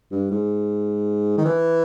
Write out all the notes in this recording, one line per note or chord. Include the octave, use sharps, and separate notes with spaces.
G2
G#2
D#3
E3